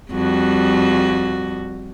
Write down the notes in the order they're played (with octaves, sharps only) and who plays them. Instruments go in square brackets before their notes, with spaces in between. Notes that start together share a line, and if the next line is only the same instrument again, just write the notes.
[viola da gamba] F2 G3 F#4